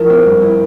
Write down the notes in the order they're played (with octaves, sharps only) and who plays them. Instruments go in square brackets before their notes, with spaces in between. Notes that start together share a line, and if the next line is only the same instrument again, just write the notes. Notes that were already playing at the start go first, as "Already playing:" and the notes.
Already playing: [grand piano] F3 E4 [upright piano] A#4
[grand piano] C4
G2
E4